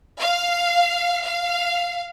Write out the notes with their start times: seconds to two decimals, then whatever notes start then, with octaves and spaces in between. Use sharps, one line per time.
0.20 F5
1.24 F5